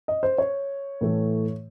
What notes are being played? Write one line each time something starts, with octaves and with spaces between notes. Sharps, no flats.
D#5
C5
C#5
A2 E3 A3